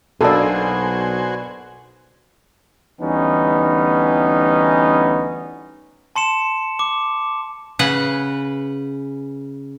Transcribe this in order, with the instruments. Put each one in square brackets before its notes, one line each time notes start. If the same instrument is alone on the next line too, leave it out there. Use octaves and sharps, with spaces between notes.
[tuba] B1 [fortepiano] B2 A#3 D4 [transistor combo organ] F#4 C5 G#5 [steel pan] A4
[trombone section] D2 E3 G3 B3 C#4 D#4
[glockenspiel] A5 C6 C#7 E7
D6
[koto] C#3 B4 F#5